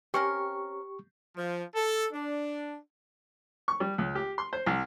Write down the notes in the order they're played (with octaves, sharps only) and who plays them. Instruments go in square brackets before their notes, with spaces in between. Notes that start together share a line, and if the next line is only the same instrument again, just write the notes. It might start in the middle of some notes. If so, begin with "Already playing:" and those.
[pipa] C4 C#4 A#4 [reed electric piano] G4 C#6
[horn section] F3
A4
D4
[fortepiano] C#6
G3
C#2
G4
C6
C5
C2